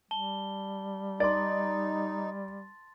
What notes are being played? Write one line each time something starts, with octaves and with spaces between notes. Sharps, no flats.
G3 A5 G7
D#4 D5 C6 A6